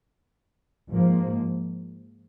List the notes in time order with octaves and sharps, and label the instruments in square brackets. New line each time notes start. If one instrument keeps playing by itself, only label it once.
[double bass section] G#2 F3 A#3